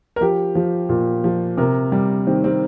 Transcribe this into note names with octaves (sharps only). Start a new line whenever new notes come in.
A#4
F3 G4
F3
A#2
F3
C3 A#4
G3
D#3 C4
C4